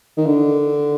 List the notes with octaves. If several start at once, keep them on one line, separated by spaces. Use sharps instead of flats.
D#3
D3